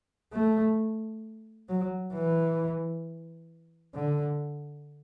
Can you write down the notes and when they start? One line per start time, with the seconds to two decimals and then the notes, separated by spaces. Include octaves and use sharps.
0.33 A3
1.69 F#3
2.13 E3
3.94 D3